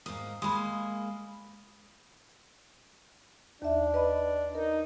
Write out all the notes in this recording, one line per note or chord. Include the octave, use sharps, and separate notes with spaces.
G#2 A#3 D#6
G#3 A#3 B5 D#6
D#2 D4 E5
B4 D#5 B5
D#4 A#4